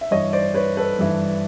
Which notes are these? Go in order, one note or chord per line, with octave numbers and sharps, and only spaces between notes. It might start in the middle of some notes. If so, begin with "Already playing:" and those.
E5
G2 E3 C#5 D#5
C5 D5
B4 C#5
A4 B4
G2 E3